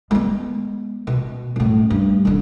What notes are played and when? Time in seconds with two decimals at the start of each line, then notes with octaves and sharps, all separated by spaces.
0.11 G#3 B3
1.07 B2
1.56 F#2 A2
1.90 G2
2.25 D#1 D3